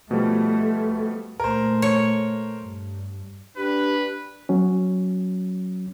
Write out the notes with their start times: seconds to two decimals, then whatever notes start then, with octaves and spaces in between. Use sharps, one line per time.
0.11 B2 F3 G3 A3
1.40 A#2 A3 A#4 C5
1.82 C#5
2.61 G2
3.57 D4 G4 B4
4.49 F#3 C#4